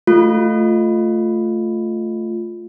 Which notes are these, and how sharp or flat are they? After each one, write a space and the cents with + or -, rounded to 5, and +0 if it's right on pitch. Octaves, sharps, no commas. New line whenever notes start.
A3 +0 F4 +0